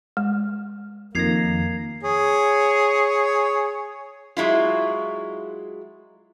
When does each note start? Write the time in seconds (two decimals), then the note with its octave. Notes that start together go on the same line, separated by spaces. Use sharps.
0.17 G#3
1.15 F2 D#3 A#3 G#6 A#6 C7 F7
2.03 G#4 C#5
4.37 F#3 G#3 E4 F4